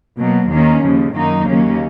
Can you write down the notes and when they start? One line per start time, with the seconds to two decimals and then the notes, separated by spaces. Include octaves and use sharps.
0.19 B2 F#3 A#3
0.51 D#2 D#3 A#3 C#4
0.83 D#2 C#3 F3
1.15 F#2 D#3 F#3 A#3 D#4
1.47 D#2 C#3 F#3 A#3 C#4